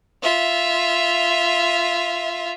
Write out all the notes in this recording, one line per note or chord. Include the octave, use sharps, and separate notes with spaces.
F4 E5